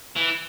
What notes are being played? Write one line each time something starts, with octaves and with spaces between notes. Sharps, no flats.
E3